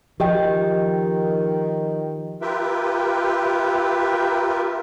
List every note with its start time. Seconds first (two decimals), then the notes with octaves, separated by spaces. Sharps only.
0.20 D#3 F3 G4 D#5 G5
2.42 F4 G4 A#4 B4 E5 G5